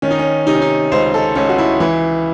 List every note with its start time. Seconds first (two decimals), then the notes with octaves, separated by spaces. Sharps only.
0.02 D#3 C#4
0.11 D#4
0.19 C#4
0.47 C3 D#4
0.55 C#4
0.61 D#4
0.92 C#2 C5
1.14 A4
1.35 C#2 C#4
1.49 F#4
1.58 E4
1.80 E3 E4